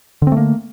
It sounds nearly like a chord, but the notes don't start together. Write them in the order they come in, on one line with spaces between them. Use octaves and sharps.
D3 C4 A3 A#3